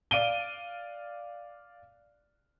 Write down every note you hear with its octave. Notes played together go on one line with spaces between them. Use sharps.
D5 F5 D7 D#7 G7